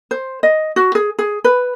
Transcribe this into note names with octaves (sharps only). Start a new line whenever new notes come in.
C5
D#5
F#4
G#4
G#4
B4